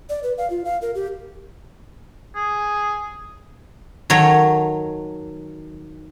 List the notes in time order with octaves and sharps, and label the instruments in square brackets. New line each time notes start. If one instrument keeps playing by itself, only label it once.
[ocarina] D5
B4
F5
F4
F5
A#4
G4
[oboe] G#4
[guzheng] D#3 F#3 A4 C#5 A#5